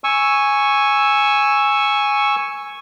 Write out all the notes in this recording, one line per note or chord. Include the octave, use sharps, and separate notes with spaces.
G#5 C#6 E6